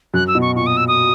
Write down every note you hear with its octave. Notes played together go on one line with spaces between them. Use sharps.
F#2 F#6
E6
B2
C#6
A#2 C#6
D#6
E6
D#6